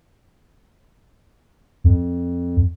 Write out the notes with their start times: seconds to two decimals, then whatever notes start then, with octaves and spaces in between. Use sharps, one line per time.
1.84 F2